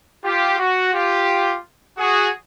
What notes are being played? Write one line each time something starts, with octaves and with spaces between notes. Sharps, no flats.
F4 G4
F#4
F4 G4
F#4 G#4